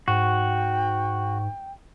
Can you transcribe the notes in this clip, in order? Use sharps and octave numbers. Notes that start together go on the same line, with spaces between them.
G#2 F#4 G5